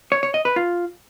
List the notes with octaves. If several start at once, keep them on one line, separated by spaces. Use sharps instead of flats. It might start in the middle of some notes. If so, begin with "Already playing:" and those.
C#5
C#5
D#5
B4
F4